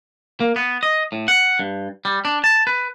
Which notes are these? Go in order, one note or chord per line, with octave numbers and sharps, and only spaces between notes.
A#3
B3
D#5
A2
F#5
G2
G3
D4
A5
B4